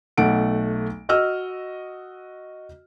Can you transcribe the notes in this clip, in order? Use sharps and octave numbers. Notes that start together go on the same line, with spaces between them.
B1 A3 F#5 D7
F#4 D#5 E6 F6